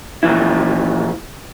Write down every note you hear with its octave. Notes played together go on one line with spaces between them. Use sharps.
A#2 E3 F3 E4